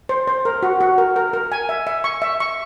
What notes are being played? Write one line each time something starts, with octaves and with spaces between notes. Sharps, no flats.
C5
C5
A#4
F#4
F#4
A#4
A#4
A#4
G#5
E5
E5
C#6
E5
C#6